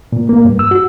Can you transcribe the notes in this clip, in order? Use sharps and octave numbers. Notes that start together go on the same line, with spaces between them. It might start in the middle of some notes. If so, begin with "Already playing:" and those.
A#2
A#3
G2
E6
F#4